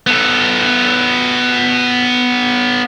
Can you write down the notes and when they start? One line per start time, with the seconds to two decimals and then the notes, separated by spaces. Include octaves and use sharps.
0.07 B3 A4